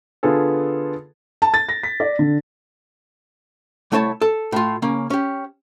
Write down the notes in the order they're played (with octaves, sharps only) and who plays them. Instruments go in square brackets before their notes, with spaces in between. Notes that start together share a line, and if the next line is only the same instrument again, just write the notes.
[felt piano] D3 B3 F4 G#4 A4
A5
A6
A#6
B6
D5
D3
[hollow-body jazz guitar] C2 A3 E4 C#5 G#5 A5
A4
A2 F4
C#3 A#3 C#4
C#4 G4